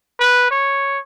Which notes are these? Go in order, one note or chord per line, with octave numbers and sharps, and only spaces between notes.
B4
C#5